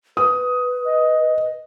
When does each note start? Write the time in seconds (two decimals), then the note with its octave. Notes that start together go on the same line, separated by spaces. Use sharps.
0.17 B4 D#6
0.86 D#5